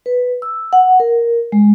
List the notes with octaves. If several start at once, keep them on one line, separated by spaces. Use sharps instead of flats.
B4
E6
F#5
A#4
G#3